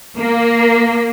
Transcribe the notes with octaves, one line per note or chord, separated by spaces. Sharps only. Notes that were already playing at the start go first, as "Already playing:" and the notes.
A#3